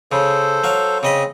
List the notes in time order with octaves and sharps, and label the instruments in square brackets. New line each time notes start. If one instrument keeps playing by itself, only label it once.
[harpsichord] C#3 [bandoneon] A4 C5
[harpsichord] F#3 F5
[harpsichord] C#3 D#5 B5 [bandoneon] C4